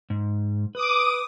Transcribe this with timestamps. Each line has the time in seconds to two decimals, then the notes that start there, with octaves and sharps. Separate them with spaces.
0.10 G#2
0.75 B4 D6 D#6